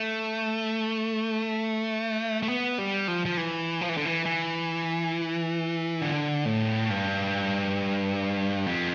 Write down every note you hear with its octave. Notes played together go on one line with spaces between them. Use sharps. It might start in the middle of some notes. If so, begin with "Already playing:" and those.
Already playing: A3
A3
B3
G3
F3
F3
E3
F3
E3
D3
E3
E3
D3
A2
G2
F2